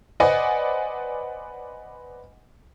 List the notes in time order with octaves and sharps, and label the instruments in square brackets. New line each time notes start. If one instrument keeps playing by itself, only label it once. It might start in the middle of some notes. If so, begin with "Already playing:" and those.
[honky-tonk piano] B4 C5 D5 D#5 F#5 G#5